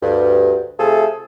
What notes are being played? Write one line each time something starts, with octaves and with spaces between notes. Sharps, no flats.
D2 G2
C3 A3 F4 G#4 A4